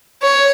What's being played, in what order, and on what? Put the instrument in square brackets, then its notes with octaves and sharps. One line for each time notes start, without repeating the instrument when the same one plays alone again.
[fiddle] C#5